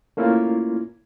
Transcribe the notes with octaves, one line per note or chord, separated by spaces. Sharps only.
A3 A#3 C#4 E4 F4